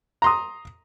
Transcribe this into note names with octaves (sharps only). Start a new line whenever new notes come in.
A#5 C6 D#6